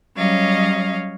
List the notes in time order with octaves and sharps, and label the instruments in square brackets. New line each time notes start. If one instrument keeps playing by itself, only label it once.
[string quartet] F#3 G3 C#4 C#5 D#5 F5